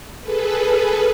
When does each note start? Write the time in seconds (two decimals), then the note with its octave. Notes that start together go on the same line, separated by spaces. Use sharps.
0.21 G#4 A4 B4